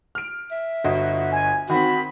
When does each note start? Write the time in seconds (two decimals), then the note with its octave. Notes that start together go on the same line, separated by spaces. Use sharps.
0.15 F6 D7
0.52 E5
0.84 G1 F#4 D#5
1.32 G#5
1.69 D#3 C4 F#4 B5